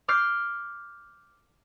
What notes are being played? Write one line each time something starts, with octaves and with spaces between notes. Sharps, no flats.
D6 F6 G6 C7